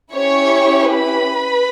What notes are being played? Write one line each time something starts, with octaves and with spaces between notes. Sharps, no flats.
C#4 E4 G4 C#5 C#6
B4 B5